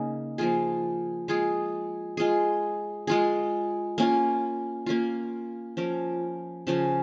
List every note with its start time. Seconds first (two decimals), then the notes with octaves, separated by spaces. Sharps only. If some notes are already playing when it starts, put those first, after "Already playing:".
Already playing: C#3 A#3 D#4
0.38 F3 A#3 F4 G#4
1.28 G#3 F4 G#4
2.17 G#3 F4 G#4
3.07 G#3 F4 G#4
3.98 A#3 C#4 F4
4.86 A#3 C#4 F4
5.77 F3 C#4 A#4
6.67 C#3 F3 C#4